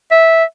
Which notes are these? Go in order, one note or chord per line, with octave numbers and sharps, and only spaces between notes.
E5